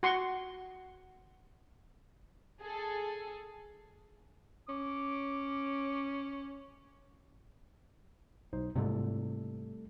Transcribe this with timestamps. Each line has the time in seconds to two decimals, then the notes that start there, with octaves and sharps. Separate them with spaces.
0.03 F#4 C6 C#6
2.61 G#4 A4
4.69 C#4 D6
8.53 B1 D#4 C5
8.76 G#2 C3 G3 A3 A4